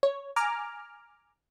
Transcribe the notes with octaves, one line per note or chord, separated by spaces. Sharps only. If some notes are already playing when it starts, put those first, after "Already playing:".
C#5
G#5 A#5 D6 F6